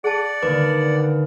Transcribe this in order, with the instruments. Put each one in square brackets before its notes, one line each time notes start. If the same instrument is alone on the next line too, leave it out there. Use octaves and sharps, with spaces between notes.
[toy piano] G#4 A5 [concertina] D5 F#5
[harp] D#2 D3 [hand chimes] B4 [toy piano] D6